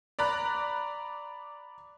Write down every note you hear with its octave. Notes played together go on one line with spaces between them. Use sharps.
D5 A#5 B5 F#6